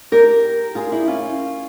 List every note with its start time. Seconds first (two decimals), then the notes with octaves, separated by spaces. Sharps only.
0.12 G4 A#4
0.75 F4 G#4
0.91 E4 G4
1.07 C#4 F4